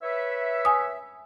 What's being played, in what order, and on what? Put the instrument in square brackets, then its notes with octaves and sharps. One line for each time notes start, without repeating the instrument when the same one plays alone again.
[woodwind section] B4 C#5 E5
[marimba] G#5 D#6